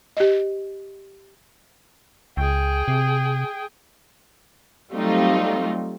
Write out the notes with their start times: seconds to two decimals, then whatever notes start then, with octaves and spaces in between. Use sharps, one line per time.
0.17 G4 D#5
2.37 C#2 G#4 G5
2.88 C3
4.92 F#3 G3 A3 C4 D#4 F4